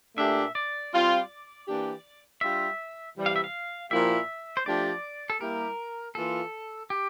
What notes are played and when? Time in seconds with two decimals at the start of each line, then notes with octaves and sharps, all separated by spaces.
0.17 A#2 A3 D4 G4 E5
0.55 D5
0.92 G3 C4 F4
1.67 E3 A#3 D4 G4
2.41 G3 D4 F4 E5
3.17 C3 E3 G3
3.26 F5
3.36 E5
3.44 F5
3.91 A#2 F3 A#3 E4 G4 E5
4.57 C5
4.66 F3 A3 D4 G4 D5
5.30 A4
5.41 G3 A#3 E4 G4 A#4
6.15 E3 A#3 F4 A4
6.90 G4